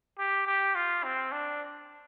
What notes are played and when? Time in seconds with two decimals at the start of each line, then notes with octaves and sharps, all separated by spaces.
0.18 G4
0.47 G4
0.75 F4
1.04 C4
1.32 D4